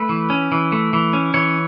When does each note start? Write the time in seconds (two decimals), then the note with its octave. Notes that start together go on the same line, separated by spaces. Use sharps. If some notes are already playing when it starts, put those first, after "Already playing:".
Already playing: A3 B4
0.09 E3
0.30 C#4
0.52 E3
0.72 A3
0.93 E3
1.13 C#4
1.34 E3 C#5